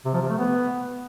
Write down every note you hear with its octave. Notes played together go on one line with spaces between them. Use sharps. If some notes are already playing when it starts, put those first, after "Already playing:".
C3
F3
C3
A3
B3